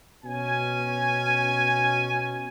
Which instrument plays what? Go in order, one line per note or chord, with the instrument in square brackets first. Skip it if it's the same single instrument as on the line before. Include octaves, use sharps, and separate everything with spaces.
[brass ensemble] B2 C#4 G#5